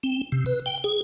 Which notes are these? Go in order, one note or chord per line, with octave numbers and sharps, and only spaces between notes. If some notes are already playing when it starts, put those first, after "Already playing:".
C4
C3
B4
G5
G#4